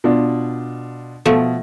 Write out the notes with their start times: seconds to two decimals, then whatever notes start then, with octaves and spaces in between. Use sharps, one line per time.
0.04 B2 D4 F4
1.25 B2 F3 A3